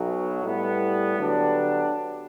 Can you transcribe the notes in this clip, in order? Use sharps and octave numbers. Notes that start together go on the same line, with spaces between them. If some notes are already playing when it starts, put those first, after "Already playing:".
Already playing: B1 B2 F#3
A2 G3 B3
D3 F#3 B3 D4 G4